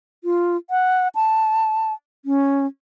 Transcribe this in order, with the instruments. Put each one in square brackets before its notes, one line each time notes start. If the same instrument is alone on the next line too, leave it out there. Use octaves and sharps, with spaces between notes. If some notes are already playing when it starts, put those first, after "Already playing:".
[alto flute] F4
F#5
A5
C#4